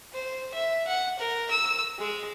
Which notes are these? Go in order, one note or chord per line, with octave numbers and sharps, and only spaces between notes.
C5
E5
F#5
A#4
E6
G#3